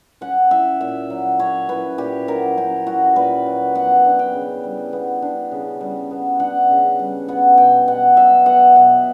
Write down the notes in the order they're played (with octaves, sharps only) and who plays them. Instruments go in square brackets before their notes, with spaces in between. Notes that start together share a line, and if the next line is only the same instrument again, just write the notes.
[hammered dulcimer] C#4 F#5
E4 E5
A#2 E5
F#3
C#4 C#5
E4 B4
A#2 G4
F#3 A#4
C#4 G4
E4 F#4
A#2 B4
F#3
B3 F#5
D4
G5
C#3
G3
B3
D4
C#3
G3
B3
D4 F#5
C#3
G3
B3 F#5
B2 G5
B2 F#5
F#3 E5
B3 F#5
B2 F#5